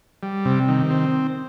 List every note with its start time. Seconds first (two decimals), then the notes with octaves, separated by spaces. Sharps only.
0.23 G3
0.45 C3
0.68 D#3
0.90 C4